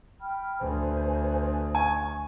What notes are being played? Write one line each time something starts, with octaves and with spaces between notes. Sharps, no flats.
G5 B5 F6
D2 B4 C5 G#5
G#5 C#6